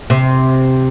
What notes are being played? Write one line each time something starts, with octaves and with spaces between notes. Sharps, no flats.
C3